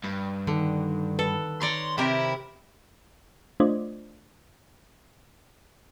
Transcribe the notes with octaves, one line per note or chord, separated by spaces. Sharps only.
G2
D3 D#3
A4 B4
C#5 D5 A#5 C6
C3 E4 G4 A#4
A3 D4 F4 C5 D5 D#5